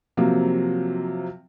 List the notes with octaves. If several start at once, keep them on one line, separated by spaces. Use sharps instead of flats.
C3 F3 F#3 A#3